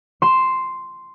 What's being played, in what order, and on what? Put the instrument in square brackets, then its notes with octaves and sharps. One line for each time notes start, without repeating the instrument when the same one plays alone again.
[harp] C6 E7